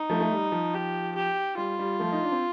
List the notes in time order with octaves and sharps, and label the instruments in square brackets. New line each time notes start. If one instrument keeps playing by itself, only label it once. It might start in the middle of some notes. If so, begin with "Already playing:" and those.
Already playing: [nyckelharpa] D#4
[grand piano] F3 A3
A3
G3
F3
[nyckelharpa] G4
G4
[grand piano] G3 [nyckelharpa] F4
[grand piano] G3
F3 A3
D#4
D4
C4